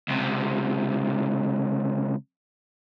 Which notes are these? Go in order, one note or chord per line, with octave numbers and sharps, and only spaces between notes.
C#2 C3